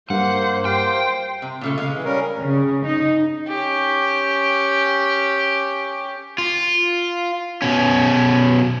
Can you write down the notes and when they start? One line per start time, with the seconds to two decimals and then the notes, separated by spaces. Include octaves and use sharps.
0.10 G2 A#3 C5 F#5
0.65 G4 C5 F5 G5
1.42 C3
1.61 A#2 C#3 A3
1.78 C#3 G#3 F5
1.93 E3
2.05 G3 C#4 A#4
2.40 C#3
2.85 D#4
3.48 C#4 G4
6.38 F4
7.62 B2 C#4